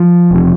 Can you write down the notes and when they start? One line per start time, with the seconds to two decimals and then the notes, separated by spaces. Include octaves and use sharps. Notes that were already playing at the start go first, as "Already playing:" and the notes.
Already playing: F3
0.31 E1 C3